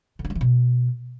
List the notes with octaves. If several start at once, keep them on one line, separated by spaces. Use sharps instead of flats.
D3
D4
F#3
E3
B2